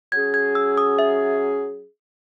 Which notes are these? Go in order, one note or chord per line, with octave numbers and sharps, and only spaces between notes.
F#3 C#4 G#4 G#6
G#6
E6
D#6
E5